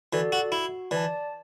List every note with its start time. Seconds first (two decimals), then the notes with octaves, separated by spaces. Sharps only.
0.13 E3 F#4 A4 D5
0.32 F#4
0.52 E4 F#4
0.91 E3 D5 A5